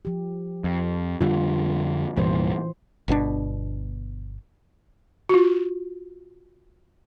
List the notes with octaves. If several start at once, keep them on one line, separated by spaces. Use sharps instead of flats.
F3 G4
F2
F2 D3 G3 F4
C2 G2 A#2 E3 C5
G1 B2 C4 D4
F4 F#4